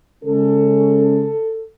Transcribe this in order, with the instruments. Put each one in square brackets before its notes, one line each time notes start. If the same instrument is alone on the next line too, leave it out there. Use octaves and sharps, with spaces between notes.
[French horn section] C#3 G#3 C#4 A4